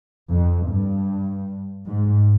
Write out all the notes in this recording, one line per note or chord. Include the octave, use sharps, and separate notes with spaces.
F2
G2
G#2